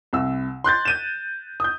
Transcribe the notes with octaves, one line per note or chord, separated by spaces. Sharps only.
C2 E6
C6 F#6 G6 A6
G6 D#7 E7
D#6 G6